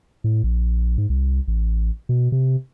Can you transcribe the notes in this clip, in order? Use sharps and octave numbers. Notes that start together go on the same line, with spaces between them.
A2
A#1
G#2
C2
A1
B2
C3